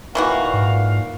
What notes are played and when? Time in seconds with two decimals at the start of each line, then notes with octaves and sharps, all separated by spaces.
0.15 A#2 D#3 E3 F#4 F5
0.54 G#2